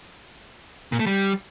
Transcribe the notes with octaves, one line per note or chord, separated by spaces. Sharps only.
A#2
A3
G3